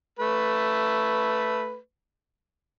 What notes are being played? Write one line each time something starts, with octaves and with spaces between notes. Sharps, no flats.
A3 B4